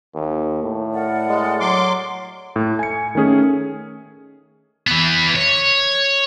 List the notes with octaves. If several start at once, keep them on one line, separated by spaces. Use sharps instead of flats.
D#2
A2
A#4 D5 F#5
G#3
F#3 C6 D6
A2
G#5 C#7
D#3 A3 C#4 G#4
E3 B3
C#5